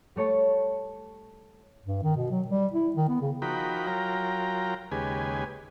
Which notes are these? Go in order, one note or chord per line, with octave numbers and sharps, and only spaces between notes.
G3 A3 C#5 A5 C#7
G2
D#3
B2
F#3
G3
E4
D#3
B3
C#3
F3 D#4 F#4 A#4 G5 B5
F#3 F4 A#4 G5 A#5
D#2 C#3 G#3 G4 B4 G#5